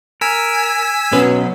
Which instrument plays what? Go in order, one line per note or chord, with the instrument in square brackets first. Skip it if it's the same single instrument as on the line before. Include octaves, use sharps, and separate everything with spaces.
[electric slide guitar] A#4 [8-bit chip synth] G#5 E6 B6
[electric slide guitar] B2 F#3 [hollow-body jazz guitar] C#4 B4